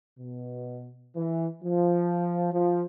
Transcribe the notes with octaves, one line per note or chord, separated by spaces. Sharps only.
B2
E3
F3
F3